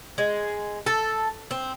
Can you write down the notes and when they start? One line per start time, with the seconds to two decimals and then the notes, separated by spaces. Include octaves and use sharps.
0.18 G#3
0.86 A4
1.51 C4